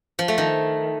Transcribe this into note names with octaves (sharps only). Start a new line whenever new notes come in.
F3
A3
D#3